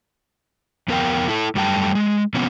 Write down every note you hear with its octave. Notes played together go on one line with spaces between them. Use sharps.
F2 B3 A#4 F5 G5
E4 A4
F#2 G3 A3 G5 A5
G#3
C3 F3 B3 C#4